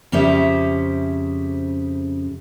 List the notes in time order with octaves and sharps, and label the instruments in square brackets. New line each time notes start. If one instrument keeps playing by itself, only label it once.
[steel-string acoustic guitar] F2 C#3 C#4 G4 C5 E5